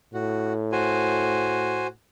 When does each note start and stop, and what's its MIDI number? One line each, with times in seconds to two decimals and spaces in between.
0.14 1.92 45
0.14 0.53 66
0.72 1.87 66
0.72 1.87 72
0.72 1.87 80